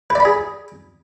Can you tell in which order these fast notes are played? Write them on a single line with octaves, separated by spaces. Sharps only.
B4 D5 B5 G#4